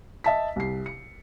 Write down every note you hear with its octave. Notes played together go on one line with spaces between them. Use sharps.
D#5 E5 A5 B6
C2 C7
C#7